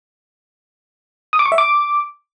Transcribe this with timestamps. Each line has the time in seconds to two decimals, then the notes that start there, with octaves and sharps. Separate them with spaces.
1.33 D#6
1.39 D6
1.46 C#6
1.52 E5
1.58 D6